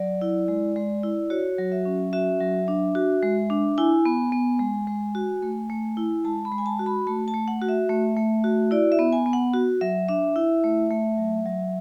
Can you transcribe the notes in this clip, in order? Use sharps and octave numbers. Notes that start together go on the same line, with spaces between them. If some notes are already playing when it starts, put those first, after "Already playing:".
Already playing: F#3 D5
E4
G#3
G#3
E4
F#4 C#5
F#3
E5
C#4
F#4 E5
F#3
D4
F#4
G#3
D4
E4 G#5
B3
B3
G#3
G#3
F#4
A3
A3
E4
G#3 A5
B5
G#3
G#5
A5
F#4
B5
A3 A5
A5
A3
F#5
F#4
E5
A3
A3
F#4
E4 D5
E5
B3
G#5
B3
F#5
F#4
F#3 E5
D4 E5
E4
A3
A3
F#3
F#3